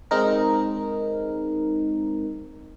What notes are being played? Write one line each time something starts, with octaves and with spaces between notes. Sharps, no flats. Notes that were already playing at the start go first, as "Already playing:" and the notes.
G#3 C4 D#4 A#4